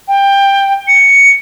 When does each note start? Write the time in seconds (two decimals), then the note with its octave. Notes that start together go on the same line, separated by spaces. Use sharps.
0.08 G5
0.88 C#7